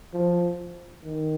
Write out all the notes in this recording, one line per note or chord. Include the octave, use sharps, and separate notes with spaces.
F3
D#3